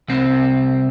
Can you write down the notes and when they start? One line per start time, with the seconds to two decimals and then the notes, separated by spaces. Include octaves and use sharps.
0.08 C2 C4